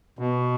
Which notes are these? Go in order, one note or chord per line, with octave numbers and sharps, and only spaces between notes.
B2